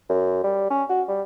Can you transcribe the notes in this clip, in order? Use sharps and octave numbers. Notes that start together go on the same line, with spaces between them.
F#2
G3
C#4
F#4
G3